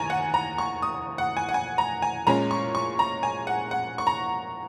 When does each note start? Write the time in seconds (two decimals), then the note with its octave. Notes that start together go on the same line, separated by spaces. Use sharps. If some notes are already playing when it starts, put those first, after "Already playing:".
Already playing: D#2 G#5 A#5 C#6
0.10 F#5
0.34 A#5
0.58 C#6
0.82 D#6
1.18 F#5
1.37 G#5
1.49 F#5
1.54 G#5
1.78 A#5
2.02 G#5
2.27 A#2 G#3 C#4 A#5
2.51 C#6
2.75 C#6
2.99 A#5
3.23 G#5
3.47 F#5
3.71 F#5
3.98 C#6
4.07 A#5